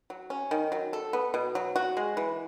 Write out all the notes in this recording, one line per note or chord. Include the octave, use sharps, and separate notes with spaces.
F#3
C#4
D#3
F#3
A4
B3
B2
F#3
F#4
G#3
E3